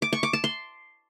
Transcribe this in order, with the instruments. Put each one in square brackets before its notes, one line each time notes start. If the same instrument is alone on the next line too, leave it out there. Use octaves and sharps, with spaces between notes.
[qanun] D6
C#6
D6
A5
C6